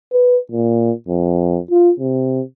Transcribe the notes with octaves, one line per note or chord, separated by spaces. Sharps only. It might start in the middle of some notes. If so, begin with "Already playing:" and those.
B4
A#2
F2
F4
C3